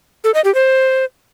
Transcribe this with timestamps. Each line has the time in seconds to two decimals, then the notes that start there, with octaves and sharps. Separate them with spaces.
0.24 A4
0.34 D#5
0.44 G4
0.55 C5